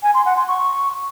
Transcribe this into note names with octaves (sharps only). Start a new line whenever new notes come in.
G#5
C6
F#5
C6
C#6